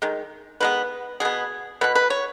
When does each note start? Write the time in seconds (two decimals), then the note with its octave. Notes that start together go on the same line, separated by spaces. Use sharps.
0.02 D#3 G#3
0.60 D#3 G#3 B3 B4
1.20 B2 B3 G#4
1.81 B2 B3 B4
1.95 B4
2.10 C#5